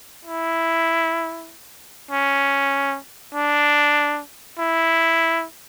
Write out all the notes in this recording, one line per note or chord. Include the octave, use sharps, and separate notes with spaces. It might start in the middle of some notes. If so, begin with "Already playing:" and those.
E4
C#4
D4
E4